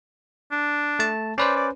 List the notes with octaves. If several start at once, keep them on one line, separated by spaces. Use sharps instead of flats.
D4
A3 A5
C#4 B4 C5 D5
D5